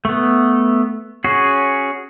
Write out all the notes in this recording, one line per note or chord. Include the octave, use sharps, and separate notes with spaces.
A3 B3
C#4 F#4 G#4